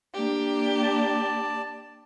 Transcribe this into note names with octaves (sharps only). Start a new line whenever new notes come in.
A#3 D4 G4
D5 A5